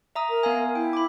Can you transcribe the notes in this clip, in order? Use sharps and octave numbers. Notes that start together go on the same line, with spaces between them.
E5 A#5 D#6
A#4
B3 F5 G#5
E4 G5
B5 D6